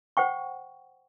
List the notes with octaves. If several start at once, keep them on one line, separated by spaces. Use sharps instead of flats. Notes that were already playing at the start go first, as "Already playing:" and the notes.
C5 F#5 G5 C#6